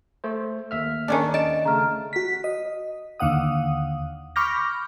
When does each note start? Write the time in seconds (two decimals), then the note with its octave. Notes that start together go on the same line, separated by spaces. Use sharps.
0.24 A3 C5
0.71 D#2 E5 F6
1.08 D#3 C#4 D4
1.34 D#5 A5 D7
1.65 C#3 A3 A#5 F6
2.13 F#4 B6
2.44 D#5
3.20 D#2 D3 F5 F#5 D#6
4.36 B5 C#6 D6 F6 G6 A#6